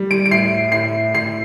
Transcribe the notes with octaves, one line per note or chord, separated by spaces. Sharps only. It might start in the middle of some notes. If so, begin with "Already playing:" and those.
Already playing: G3
D7
D7
A2 C7
A2 C7
A2 C7